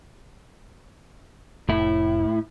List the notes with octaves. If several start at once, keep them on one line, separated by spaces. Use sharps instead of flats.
F1 A2 A3 E4